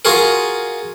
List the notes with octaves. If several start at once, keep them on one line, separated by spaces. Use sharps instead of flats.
F4 F#4 G#4 A#4